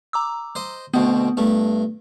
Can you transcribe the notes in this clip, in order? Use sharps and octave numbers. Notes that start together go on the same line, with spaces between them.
A#5 D6 E6
C5 D#5
D2 B2 B3 C4
G2 A3